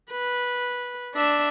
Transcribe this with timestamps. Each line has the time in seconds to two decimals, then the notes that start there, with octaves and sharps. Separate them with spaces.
0.11 B4
1.15 D4 E5